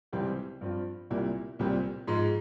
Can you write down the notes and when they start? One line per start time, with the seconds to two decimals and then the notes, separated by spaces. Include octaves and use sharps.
0.13 C#2 C3 E3 G3 C4
0.61 G2 F3 C4 F4
1.10 C2 A#2 G3 A#3 E4
1.59 C2 A#2 G3 C4
2.07 G#2 F3 G#3